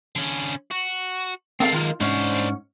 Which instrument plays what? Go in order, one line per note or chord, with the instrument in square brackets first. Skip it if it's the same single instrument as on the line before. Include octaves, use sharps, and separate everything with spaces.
[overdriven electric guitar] D3 C#4
F#4
[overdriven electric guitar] G#3 A#3 [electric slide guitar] C4 A4 F5
[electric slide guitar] D#3 F4
[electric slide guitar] G#2 C#4 [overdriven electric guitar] D4 C5